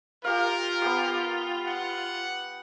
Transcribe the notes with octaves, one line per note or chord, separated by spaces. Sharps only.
F4 G4 A#4 F5
B3 G4
F#5